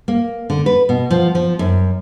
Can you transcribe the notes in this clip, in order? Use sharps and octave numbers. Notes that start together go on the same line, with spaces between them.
A#3
D3
B4
B2
F3
F3
F#2